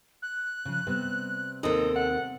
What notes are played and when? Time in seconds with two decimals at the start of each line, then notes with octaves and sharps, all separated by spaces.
0.22 F#6
0.65 C#3 F3
0.87 C3 G3 B3
1.63 D#2 C4 D#4 A4
1.96 F#5